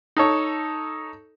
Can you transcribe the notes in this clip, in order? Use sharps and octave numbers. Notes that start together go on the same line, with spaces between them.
D#4 A4 C#5